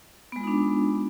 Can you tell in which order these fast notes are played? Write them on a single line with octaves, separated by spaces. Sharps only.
B3 G#3 F4 D#4 D4